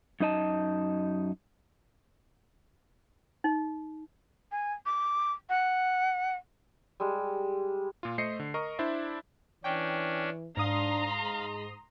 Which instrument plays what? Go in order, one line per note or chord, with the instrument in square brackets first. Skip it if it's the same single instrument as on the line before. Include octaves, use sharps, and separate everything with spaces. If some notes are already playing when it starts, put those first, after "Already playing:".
[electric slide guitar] F#2 D#4 D#5 A5
[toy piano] D#4
[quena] G#5
D6
F#5
[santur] G3 G#3
[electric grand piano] A#2 F4
A3 C5 D#5 C7 C#7
D3
A#4 D#5 C#6
D4 E4 C5 D5 E5
[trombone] E3 [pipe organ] C#4 D4 [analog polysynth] G5
[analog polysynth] G#2 D#6 [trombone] D4 [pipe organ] F5 [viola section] A#5 C6
[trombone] G#3